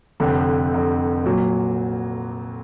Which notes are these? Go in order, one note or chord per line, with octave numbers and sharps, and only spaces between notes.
F1 F2 D3
F1 F2 D3
A#2 F#3